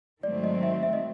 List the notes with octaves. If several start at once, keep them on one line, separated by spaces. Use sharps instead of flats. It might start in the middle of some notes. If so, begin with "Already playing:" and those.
G#2 D#3 F#3 A3 C4 D5
D#5
E5
E5
D#5